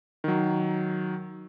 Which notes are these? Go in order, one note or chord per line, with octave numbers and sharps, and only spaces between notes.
D#3 F#3